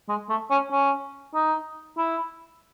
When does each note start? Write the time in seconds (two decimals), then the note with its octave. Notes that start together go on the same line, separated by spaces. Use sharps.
0.09 G#3
0.29 A3
0.50 C#4
0.72 C#4
1.35 D#4
1.98 E4